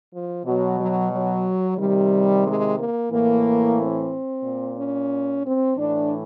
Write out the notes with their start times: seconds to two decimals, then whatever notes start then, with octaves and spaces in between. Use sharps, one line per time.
0.13 F3
0.45 B2 F#3
0.79 F#3
1.12 F#3
1.78 C3 D#3 G3
2.46 G#3
2.78 A#3
3.12 A2 E3 A#3
3.78 C4
4.44 A#2
4.77 C#4
5.44 C4
5.77 A2 E3 D4